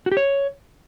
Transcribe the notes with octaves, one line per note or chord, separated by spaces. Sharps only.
F#4
G4
C#5